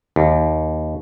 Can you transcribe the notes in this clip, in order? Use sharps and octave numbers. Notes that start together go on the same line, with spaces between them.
D#2